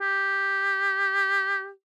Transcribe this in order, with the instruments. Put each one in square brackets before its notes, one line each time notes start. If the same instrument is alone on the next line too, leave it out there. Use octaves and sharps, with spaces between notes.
[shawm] G4